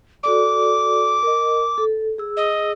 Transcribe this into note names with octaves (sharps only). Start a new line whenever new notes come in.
F#4 A4 D5 D6
A#4 D#5
A4
G#4 E6
D#5